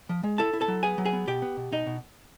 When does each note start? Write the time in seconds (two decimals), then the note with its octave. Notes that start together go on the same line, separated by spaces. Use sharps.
0.09 F3
0.23 G#3
0.38 E4 A4 A5
0.53 E4
0.61 A4 A5
0.68 F#3
0.83 B3 G#4 G#5
0.98 F#3
1.05 G#4 G#5
1.13 B3
1.27 B2 G4 G5
1.42 B3
1.57 B2
1.72 B2 D#4 D#5
1.86 B2